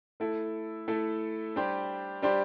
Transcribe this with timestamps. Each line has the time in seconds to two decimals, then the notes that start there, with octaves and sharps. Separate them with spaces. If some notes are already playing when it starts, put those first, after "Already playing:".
0.20 A3 E4 A4
0.88 A3 E4 A4
1.56 G3 D4 G4 C5
2.22 G3 D4 G4 C5